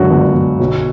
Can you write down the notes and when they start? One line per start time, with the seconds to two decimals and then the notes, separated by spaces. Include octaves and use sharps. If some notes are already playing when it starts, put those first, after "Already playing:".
Already playing: C#2 F#2 D3 F#4
0.10 G1
0.34 G1
0.60 B1